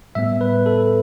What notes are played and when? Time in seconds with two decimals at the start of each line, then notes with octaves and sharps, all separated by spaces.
0.15 A2 G3 B3 E5
0.41 B4
0.66 A4